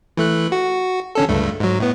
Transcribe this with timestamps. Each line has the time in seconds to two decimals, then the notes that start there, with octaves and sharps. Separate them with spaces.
0.17 E3 A3 F#6
0.52 F#4
1.15 D3 C#4 A4
1.29 C#2 G2 A3
1.60 G#2 F#3
1.80 A2 B3